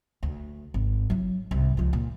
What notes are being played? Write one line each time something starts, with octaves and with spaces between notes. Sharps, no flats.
D2
G#1
F#3 E4
C2 G#2
C#2 F3
A#2